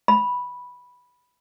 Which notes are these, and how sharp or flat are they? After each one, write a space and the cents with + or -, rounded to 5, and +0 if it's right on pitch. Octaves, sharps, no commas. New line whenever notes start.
B5 -5